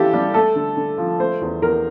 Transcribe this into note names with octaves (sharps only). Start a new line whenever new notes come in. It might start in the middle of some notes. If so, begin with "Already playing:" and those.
Already playing: E3 D4 F4 G4 A4
G3
A3 A4
D3
D3
F3
A3 C5
E2
E2 A#4